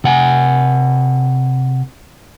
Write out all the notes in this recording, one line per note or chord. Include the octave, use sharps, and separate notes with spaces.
C3 F#5 G#5